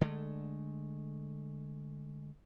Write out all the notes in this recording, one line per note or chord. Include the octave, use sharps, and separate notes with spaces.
D3 G#3 A3